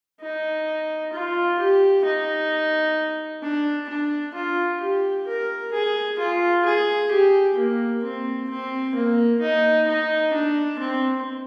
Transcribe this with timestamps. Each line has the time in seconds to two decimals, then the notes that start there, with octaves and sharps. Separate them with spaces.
0.20 D#4
1.13 F4
1.58 G4
2.04 D#4
3.43 D4
3.89 D4
4.35 F4
4.81 G4
5.27 A#4
5.72 G#4
6.19 F4
6.65 G#4
7.11 G4
7.57 A#3
8.03 C4
8.49 C4
8.95 A#3
9.41 D#4
9.87 D#4
10.33 D4
10.79 C4